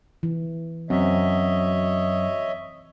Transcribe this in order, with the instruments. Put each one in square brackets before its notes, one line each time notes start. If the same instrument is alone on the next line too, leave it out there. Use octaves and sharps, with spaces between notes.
[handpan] E3
[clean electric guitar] F#2 [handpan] C4 [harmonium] C#5 D#5 E5